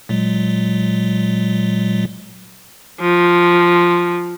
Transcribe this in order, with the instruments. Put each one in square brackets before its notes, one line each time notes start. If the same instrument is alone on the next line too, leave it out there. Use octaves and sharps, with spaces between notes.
[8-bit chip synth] A#2 F#3 G#3
[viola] F3